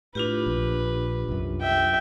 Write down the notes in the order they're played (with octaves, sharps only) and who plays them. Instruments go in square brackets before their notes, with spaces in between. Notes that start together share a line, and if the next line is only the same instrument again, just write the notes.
[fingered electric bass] A2 [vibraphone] D4 F4 G4 [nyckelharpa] B4
[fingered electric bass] A#1
C2 F#2
[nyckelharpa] E5 G5